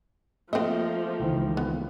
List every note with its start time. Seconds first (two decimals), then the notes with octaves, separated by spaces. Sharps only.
0.53 F3 A3 A#3 C4 D#5
1.19 C#2 D#3 E3
1.57 B3